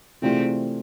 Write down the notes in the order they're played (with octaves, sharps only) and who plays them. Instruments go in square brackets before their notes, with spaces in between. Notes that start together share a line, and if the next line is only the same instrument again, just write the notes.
[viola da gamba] C3 C4 [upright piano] E3 A3 D4 F4 G#4